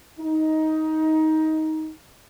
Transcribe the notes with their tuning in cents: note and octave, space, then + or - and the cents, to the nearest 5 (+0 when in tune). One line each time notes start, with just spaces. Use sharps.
D#4 +15